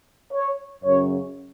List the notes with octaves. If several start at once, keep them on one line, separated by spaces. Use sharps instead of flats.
C#5
F#2 C#3 C#5